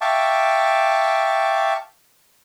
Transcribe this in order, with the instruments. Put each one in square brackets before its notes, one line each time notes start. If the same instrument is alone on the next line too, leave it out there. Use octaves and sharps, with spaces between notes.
[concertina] E5 F5 G5 A5 C#6 D6